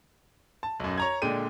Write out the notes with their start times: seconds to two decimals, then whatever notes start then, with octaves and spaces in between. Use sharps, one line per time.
0.63 A5
0.80 B1 F#2
0.97 C#5 A#5 G#6
1.22 A#2 D3 G#3 G5 D#7